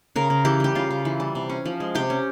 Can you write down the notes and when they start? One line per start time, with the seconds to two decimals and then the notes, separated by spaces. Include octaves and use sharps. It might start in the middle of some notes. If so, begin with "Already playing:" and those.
0.16 C#3 A#4
0.30 C#3
0.45 E3 G4
0.60 G3 G4
0.75 C#3 F4
0.91 C#3
1.05 E3
1.20 G3
1.35 C3
1.50 C#4
1.65 F3
1.80 G#3
1.95 C3 G4
2.10 C#4